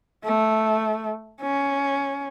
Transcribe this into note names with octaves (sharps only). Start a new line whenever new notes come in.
A3
C#4